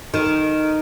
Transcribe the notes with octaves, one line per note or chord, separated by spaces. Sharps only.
D#3